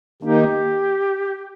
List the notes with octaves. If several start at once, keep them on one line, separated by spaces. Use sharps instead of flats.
D#3 A#3 D#4 G4